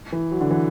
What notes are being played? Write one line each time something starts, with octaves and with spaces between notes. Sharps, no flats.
E3
F#3
D3
E3